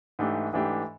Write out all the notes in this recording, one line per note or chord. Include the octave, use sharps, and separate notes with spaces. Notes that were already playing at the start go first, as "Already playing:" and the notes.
G#2 E3 A3 D4 G4
G#2 E3 A3 D4 G4